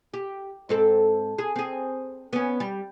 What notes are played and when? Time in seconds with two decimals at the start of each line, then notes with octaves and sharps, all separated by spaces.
0.14 G4
0.69 G#2 C4 A4
1.38 G#4
1.56 C4 G#4
2.33 B3 C#4
2.60 G3